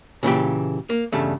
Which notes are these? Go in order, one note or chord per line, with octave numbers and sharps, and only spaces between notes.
A#2 C#3 E3 G4
A#3
E2 G2 C#3 G3 A3